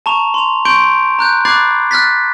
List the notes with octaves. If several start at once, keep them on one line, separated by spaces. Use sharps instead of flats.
A5 A#5 C#6 F7
C6 F7
C6 C#6 G6 D7
A#5 F#6 G6
B5 D6 F#6 G#6 A6 C7
F6 F#6 A6 B6